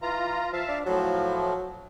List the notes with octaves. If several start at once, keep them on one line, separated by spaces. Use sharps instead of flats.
E3 F4 A#5
F3 E5 F5 A5
D4
A2 F3 F#3